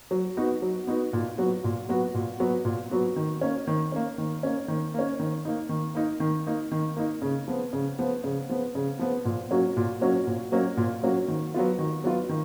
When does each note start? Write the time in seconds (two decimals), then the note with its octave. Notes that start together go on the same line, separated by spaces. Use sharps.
0.11 F#3
0.37 B3 D#4 F#4
0.62 F#3
0.87 B3 D#4 F#4
1.13 A#2
1.38 F#3 B3 F#4
1.64 A#2
1.89 F#3 B3 F#4
2.14 A#2
2.40 F#3 B3 F#4
2.65 A#2
2.91 F#3 B3 F#4
3.16 D#3
3.41 A#3 C#4
3.67 D#3
3.92 A#3 C#4
4.18 D#3
4.43 A#3 C#4
4.68 D#3
4.94 A#3 C#4
5.20 D#3
5.45 A#3 D#4
5.69 D#3
5.95 A#3 D#4
6.20 D#3
6.47 A#3 D#4
6.72 D#3
6.96 A#3 D#4
7.22 C#3
7.48 F3 B3
7.73 C#3
7.99 F3 B3
8.24 C#3
8.49 F3 B3
8.75 C#3
8.99 F3 B3
9.25 A#2
9.51 F#3 A#3 C#4 F#4
9.77 A#2
10.01 F#3 A#3 C#4 F#4
10.27 A#2
10.52 F#3 A#3 C#4 F#4
10.77 A#2
11.03 F#3 A#3 C#4 F#4
11.28 D#3
11.54 F#3 B3 F4
11.79 D#3
12.04 F#3 B3 F4
12.29 D#3